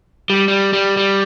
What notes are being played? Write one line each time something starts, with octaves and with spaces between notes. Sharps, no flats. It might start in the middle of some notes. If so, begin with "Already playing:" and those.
G3
G3
G3
G3